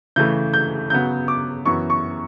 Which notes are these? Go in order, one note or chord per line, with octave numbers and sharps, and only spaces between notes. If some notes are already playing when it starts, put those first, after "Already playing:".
C#3 E3 A3 G6
G6
C#3 F#3 B3 G6
D6
F#2 E3 B3 C#6
C#6